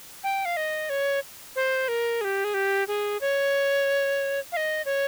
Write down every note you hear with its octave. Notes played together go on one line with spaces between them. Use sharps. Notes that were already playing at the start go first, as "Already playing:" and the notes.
G5
F5
D#5
C#5
C5
A#4
G#4
G4
G#4
G4
G#4
C#5
F5
D#5
C#5